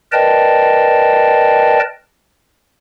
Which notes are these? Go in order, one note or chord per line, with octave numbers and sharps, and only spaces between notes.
A#4 B4 D5 D#5 G5 A5